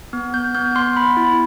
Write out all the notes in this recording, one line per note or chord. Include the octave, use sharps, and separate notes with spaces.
B3
B3 G6
B3 G6
B3 C6
B3 B5
E4